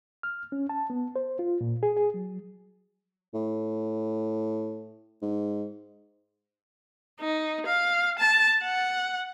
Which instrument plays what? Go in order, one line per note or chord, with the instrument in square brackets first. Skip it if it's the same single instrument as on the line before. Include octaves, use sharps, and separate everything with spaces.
[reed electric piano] F6
C#4
A5
B3
C5
F4
A#2
G#4
G#4
F#3
[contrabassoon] A2
G#2
[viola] D#4
F5
A5
F#5